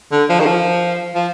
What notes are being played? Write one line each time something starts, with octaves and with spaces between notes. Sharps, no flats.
D3
F3
D#3
F3
F3